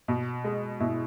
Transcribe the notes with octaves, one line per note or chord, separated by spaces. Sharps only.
B2
G#3
B2 E4